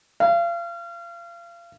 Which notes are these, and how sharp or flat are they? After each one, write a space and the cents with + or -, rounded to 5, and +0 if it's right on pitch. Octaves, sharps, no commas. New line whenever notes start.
F5 -35